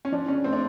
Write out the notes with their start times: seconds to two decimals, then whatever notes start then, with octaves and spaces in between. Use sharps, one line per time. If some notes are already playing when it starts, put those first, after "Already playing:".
0.05 C#4
0.12 F3 D4
0.28 C#3 C#4
0.44 A3 C4
0.53 D4